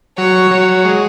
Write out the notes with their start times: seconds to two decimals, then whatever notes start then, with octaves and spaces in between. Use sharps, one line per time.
0.17 F#3 C#5
0.51 F#3
0.85 G#3